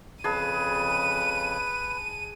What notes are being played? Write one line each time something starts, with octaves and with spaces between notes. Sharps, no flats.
F2 C#3 G#4 B4 A5 D#7